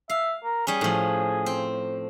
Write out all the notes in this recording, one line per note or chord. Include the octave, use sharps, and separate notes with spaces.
E5 F5
A#4
G3 C#4 G#4
A2 F3
C4